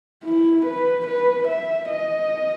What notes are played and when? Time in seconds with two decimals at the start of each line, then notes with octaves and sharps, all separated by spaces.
0.24 E4
0.66 B4
1.07 B4
1.48 E5
1.90 D#5